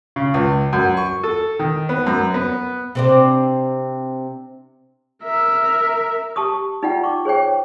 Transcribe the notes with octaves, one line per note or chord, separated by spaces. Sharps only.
C#3
C#2
F#2
C#6
A4
D#3
B3
F#2
B3
C3 C4 D4
A#4 E5
G4 A5 C#6 D#6
D#4 F4 D5 F#5 G5
C#6 D6
G#4 C5 C#5 G5